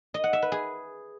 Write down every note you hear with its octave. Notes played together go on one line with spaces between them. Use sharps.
D#5
F#5
E5
B4
G#4